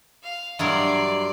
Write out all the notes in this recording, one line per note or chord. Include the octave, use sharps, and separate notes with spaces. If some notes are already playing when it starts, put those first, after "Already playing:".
F5
G2 F#3 E4 A#4 D5 D#5 C6